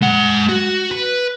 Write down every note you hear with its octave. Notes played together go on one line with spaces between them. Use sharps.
G#3 F#5
F#4
B4